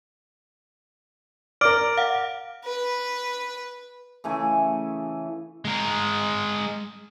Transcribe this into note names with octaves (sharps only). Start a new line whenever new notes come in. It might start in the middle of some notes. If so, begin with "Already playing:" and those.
A#4 D5 D6 F6 D7
F5 F#5
B4
C#3 E3 A3 G#5
G#3 A#4